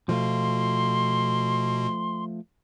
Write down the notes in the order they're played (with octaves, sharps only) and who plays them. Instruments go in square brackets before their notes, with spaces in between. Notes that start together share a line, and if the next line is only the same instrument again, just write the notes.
[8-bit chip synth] B2 [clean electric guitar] F3 A3 F4 [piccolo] C6